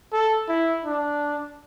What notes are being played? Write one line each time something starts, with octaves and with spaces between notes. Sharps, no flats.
A4
E4
D4